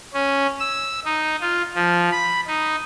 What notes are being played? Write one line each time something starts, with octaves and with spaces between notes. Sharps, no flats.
C#4
E6
D#4
F4
F3
B5
D#4